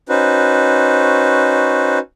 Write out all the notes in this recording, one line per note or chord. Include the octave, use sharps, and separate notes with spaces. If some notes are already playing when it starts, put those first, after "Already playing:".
C#4 D#4 F#4 B4 C5